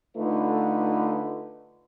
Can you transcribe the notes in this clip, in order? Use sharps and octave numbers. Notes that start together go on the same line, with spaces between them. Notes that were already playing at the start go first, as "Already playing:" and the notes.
D3 A3 D#4 F4 B4